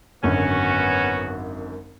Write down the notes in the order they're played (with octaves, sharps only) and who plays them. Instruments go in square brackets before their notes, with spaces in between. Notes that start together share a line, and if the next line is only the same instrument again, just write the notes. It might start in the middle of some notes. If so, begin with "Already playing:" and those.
[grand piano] G#1 F#2 D3 [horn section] B3 C#4 F#4